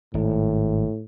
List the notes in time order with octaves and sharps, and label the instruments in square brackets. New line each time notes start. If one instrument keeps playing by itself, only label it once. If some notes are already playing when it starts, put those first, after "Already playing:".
[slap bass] G#1 [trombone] A2